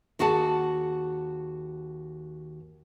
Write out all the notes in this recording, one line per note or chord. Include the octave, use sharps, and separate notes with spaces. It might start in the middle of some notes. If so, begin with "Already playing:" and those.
D#2 F#4 G#4 F#5 A5